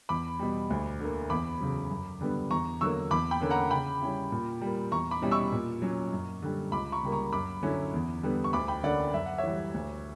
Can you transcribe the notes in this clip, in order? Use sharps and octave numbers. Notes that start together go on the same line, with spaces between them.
E2 B5 D6
B2 G3
D2
D3 A#3
E2 B5 D6
C#3 F#3
F#2
D3 G3 B3 D4
E2 A#5 C#6
D3 F#3 A#3 C#6 E6
E2 B5 D6
G5 B5
D3 A#3 C#4
F#5 A#5
C#3 G5 B5
G3 C#4 E4
A#2
G3 A#3
E2 A#5 C#6
B5 D6
B2 G3 C#4 E4
C#6 E6
A#2
F#3 C#4
F#2
D3 G3
C#2 B5 D6
A#5 C#6
C#3 G3 A#3
A#5 C#6
F#2 B5 D6
D3 F#3 C#4 E4
E2
D3 G3 B3
C#6
D2 B5 D6
G5 B5
D3 A#3 C#4 D5 F#5
F#2 E5
F#5
C#5 E5
E3 G3
D2